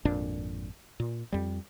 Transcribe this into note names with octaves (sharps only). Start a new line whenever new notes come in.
G#1 F2 A#2 D4
A#2
F2 G3